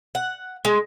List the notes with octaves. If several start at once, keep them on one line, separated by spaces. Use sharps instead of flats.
F#5
G#3